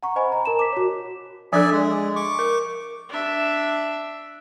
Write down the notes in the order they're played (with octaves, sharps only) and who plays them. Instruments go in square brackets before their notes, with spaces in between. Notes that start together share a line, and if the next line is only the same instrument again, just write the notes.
[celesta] F#5 A#5 C#6
C5 D#5 G#5 B5
A#5
A#4 A5 A#5 E7
D6 B6
F#4 C#5
[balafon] F3 D4 A4 [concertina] D5 E5 G#5
[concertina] G#3
C#6 D6
[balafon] A#4
[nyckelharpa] D4 E5